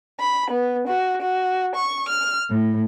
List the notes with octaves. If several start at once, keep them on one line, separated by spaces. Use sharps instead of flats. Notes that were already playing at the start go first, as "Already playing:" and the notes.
B5
B3
F#4
F#4
C#6
F6
A2